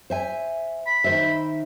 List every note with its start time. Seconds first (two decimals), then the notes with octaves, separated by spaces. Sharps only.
0.10 C5 E5 G#5
0.86 B5
1.04 D#3 C5 E5